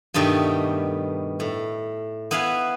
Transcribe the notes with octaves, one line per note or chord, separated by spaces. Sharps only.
G2 B2 D#3 G3 A3
A2
B3 E4 B4 F5 F#5 G#5